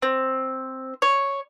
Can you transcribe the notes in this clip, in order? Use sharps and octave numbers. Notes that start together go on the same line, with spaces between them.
C4
C#5